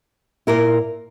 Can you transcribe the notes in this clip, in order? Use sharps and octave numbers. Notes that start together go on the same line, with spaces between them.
A#2 A#3 E4 A#4